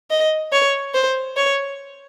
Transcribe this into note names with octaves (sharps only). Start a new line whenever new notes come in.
D#5
C#5
C5
C#5